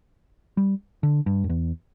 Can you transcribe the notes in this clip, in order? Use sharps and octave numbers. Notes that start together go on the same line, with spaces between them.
G3
D3
G2
F#2
E2